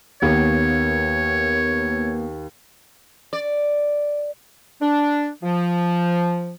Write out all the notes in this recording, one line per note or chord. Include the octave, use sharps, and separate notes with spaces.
D#2 A#3 B3 C#5
D5
D4
F3